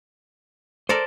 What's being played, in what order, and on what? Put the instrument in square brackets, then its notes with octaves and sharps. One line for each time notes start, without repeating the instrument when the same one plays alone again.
[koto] A4 A#4 D5 [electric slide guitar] C5